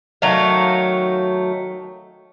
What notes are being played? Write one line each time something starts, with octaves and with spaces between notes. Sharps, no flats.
D#3 F#3 A3 F5